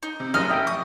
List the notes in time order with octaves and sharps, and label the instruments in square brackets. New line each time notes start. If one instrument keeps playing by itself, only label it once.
[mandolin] D#4
[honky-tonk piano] C3
[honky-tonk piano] F#1 F#2 [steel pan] D#5 [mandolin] F6
[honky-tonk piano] F1 [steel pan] D#5 E5 G5
[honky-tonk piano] C#6 [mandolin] D#6